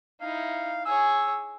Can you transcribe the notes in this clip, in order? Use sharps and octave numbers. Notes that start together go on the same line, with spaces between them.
D#4 E4 F5
G#4 C#5 E6